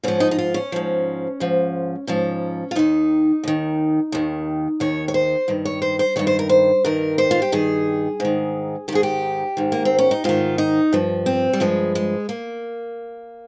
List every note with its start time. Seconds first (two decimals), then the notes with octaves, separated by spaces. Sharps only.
0.03 G#2 F3 C#4
0.20 D#4
0.31 D#4
0.39 F4
0.54 C#4
0.72 G#2 F3
1.40 G#2 F3
2.07 G#2 F3 C#4
2.71 F4
2.75 D#2 D#3 D#4
3.44 D#2 D#3
4.12 D#2 D#3
4.80 D#2 D#3 C#5
5.08 C#5
5.14 C5
5.48 G2 D#3
5.65 C#5
5.82 C5
5.99 C5
6.16 G2 D#3 C#5
6.27 C5
6.39 A#4
6.49 C5
6.85 G2 D#3 A#4
7.18 C5
7.31 F4
7.42 G4
7.52 G2 D#3 G#4
8.20 G#2 D#3
8.88 D#3 G4
8.92 G#2 G#4
9.03 G4
9.57 G#2 D#3
9.72 A#3
9.85 C4
9.99 C#4
10.11 D#4
10.24 G#2 D#3 F4
10.58 D#4
10.93 G2 F3
11.26 C4
11.53 G3
11.60 G2 F3 G#3
11.95 G#3
12.29 A#3